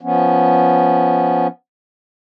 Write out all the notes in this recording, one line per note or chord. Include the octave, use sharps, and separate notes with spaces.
F3 B3 C#4